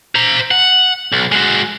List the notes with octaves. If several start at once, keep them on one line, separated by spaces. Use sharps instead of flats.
C5 A#5
F#5
B1
G#3 F#4